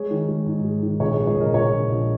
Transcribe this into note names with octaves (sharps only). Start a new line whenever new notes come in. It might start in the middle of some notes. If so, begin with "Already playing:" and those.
Already playing: G#3 G#4 C#5
D#3
G#3
G#2
G#3
D#3
A#1 G#4 C#5
G#4 C#5
G#3
G#4 C#5
A#1 A#4 D#5
A#1 G#4 C#5
A#1
A#1